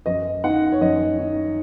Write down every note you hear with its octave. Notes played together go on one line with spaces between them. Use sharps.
F#2 D#5
D#3 F#5
C#5
F#2 D#5
D#3